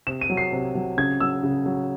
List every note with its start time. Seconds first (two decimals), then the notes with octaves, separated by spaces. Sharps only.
0.07 C3 E7
0.21 D#7
0.30 F#3
0.37 C7
0.52 C3
0.75 F#3
0.97 C#3 G#6
1.20 F#3 E6
1.43 C#3
1.66 F#3